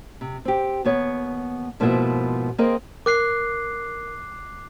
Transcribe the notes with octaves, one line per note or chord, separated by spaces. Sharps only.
C3
C4 G4
D#2 B3 C#5 F#5
G#2 B2 F3 A#3 E4 E5
A#3 C4 G#4 A#4 D#5
A#4 D6 F#6 C7